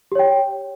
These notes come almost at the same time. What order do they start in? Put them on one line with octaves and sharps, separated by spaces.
G4 C#5 G5